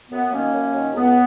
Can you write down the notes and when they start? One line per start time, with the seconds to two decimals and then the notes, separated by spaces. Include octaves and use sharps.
0.11 F#2 B3
0.32 D#3 F#3 A#3 C#4
0.53 F#2
0.74 D#3 F#3
0.94 C#2 B3